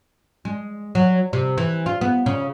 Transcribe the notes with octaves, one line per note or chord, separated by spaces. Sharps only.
G#3
F#3
C3
E3
F4
B3
C#3